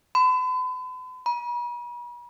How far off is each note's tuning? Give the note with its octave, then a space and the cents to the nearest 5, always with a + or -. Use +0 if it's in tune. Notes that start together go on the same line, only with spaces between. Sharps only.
B5 +45
B5 -45